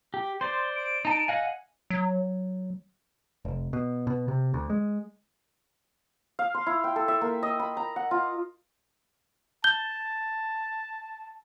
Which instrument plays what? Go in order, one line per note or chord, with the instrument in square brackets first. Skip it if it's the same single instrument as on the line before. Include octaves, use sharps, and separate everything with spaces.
[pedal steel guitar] G4
[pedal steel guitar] C5 D5 [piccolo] C6
[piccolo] D7
[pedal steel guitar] D#4 A5
[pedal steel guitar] D#5 F#5 G#5 [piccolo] F5
[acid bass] F#3
[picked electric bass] F1
B2
B2
C3
D2
G#3
[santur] F5
C6
E4
G5
A4
E5
A#3
D#5
B5
A#5
F#5
F4
[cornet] A5 [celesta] G6 G7